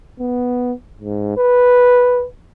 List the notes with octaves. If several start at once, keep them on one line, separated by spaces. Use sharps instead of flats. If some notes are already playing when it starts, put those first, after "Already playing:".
B3
G#2
B4